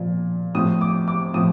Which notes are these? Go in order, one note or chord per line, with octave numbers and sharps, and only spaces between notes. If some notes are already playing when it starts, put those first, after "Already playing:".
Already playing: A#2 F3
A2 F3 D#6
D6
D6
A2 F3 D#6